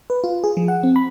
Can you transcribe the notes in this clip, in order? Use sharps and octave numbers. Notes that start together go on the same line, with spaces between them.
B4
F4
G#4
F3
F#5
C4
B5